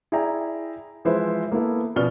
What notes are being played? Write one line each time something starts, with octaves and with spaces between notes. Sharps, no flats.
E4 G#4 D5 E5 G5 A#5
E3 F3 G#3 E4 B4 C5
A#3 B3 E4 A4
B2 F3 C#4 D5 F6 G7